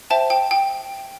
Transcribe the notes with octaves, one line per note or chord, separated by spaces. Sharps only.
C5 E5 G5 A5
G5
G5